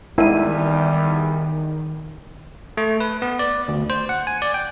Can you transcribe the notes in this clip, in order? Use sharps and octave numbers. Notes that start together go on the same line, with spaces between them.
G#1 E2 D#3 G3 E4 D#7
A3
B4
B3
D5
D2
C5
F#5
G#5
D5
G5